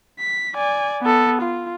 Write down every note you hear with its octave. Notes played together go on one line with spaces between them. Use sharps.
B6
D5 G#5
B3 A4
F4